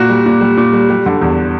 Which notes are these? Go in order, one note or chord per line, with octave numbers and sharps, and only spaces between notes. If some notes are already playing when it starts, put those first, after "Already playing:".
Already playing: A#2 F#4
G3
A#2
G3
A#2
G3
G3
D3
E2